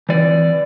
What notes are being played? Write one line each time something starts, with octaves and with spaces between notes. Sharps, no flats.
E3 D5